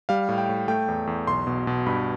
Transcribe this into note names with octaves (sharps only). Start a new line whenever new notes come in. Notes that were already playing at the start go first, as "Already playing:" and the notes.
G3 F5
A2
G5
A2
A3 G5
E2
E2
B1 C6
B2
B2
G2 B5